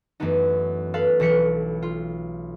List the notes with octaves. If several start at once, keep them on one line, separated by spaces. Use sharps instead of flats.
F#2 E3 A3 B3 D#4
A4 B4 F5
B1 E3 B6 C#7
F4